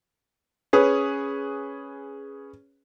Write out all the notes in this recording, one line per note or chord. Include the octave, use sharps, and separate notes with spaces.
C#4 G#4 B4